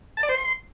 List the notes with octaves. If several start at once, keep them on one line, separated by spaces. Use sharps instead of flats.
A5
D5
C5
C6